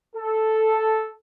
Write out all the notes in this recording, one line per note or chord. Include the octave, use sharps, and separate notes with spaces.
A4